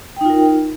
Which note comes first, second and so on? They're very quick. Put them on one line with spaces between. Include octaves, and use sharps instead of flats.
G5 D#4 F4 A#4